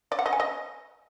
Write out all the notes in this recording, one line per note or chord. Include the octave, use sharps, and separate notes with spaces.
D5
F#5
D#5
G#5
D#5